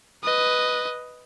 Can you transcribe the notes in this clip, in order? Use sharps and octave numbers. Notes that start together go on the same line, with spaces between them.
B4 D#5